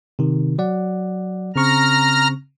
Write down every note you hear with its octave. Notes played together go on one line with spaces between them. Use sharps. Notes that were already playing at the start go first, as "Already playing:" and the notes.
C3 D#3
F#3 D5 F#5
C#3 C4 A#5 C#6 F6